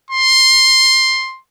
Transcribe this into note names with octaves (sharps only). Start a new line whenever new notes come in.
C6